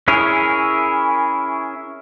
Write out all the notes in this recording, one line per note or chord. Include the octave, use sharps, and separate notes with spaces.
C#4 E4 G#4 A#4